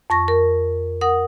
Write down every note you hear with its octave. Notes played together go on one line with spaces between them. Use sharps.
F2 C#6 A#6
A#4
A#4 F#5 D#6